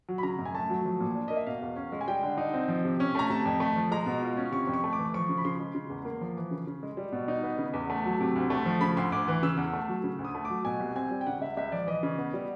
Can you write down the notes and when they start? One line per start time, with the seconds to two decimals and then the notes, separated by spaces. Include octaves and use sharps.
0.09 F#3
0.18 B5
0.23 C#3 A#5
0.39 F#2
0.45 G#5
0.55 A3 A5
0.70 F#3
0.85 F3
1.00 A#2
1.15 D4
1.28 A#3 D#5
1.37 E5
1.47 B2 F5
1.62 E2
1.76 C#4
1.92 G#3
2.01 G#5
2.08 G3 G5
2.23 D3
2.38 D#4
2.53 C4
2.68 F3
2.85 C3
3.00 C#4
3.15 A3 A#5
3.30 C3 A5
3.45 F2
3.60 A3
3.76 F3
3.91 G#3 A#5
4.06 B2
4.23 F4
4.37 C#4
4.52 C3 C#6
4.67 F2
4.74 C#6
4.84 A3
4.93 D6
4.98 E3
5.14 F3 C#6
5.29 C#3
5.37 B5
5.45 C#3 C6
5.60 G#3
5.75 C#3
5.90 E2
6.05 A#3
6.21 F3
6.37 E3
6.51 C#3
6.67 C#3
6.83 G#3
6.97 G3
7.12 B2
7.28 D#4
7.43 B3
7.58 C#3
7.73 E2
7.90 A3
8.05 F#3
8.21 C3
8.35 D2
8.50 A3
8.66 F3
8.81 C#3 B5
8.97 D2 C6
9.12 D2 D6
9.28 E3
9.43 C#3 E6
9.57 E2
9.73 A3
9.89 F#3
10.04 C#3
10.18 D2
10.25 D#6
10.35 A3
10.45 F#3 D6
10.65 B2 G#5
10.80 C2
10.96 C4 G#5
11.11 G3
11.21 G5
11.27 C#3 F#5
11.41 C#2 E5
11.57 C#2 E5
11.72 F3 D5
11.87 E3 D#5
12.03 C#3
12.18 B3
12.34 G3